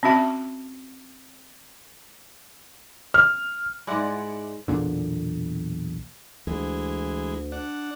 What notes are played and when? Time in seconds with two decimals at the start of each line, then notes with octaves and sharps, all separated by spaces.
0.03 C4 C#4 F#4 E5 A5
3.14 F6
3.87 G#2 G#3 E4 D5 F#5
4.68 B1 E2 A#2 D3
6.47 D2 E3 G#3
7.52 D4 F#5